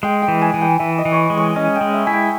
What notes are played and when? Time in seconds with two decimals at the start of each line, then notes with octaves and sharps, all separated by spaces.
0.03 G#3 G5
0.22 G5
0.28 E3
0.42 G#5
0.54 E3
0.61 G5
0.79 E3 E5
0.98 D#5
1.05 E3
1.12 C#5
1.18 B4
1.30 G#3
1.37 C#5
1.56 C#4 D#5
1.76 G5
1.81 G#3
1.94 E5
2.06 E4 G#5
2.13 G5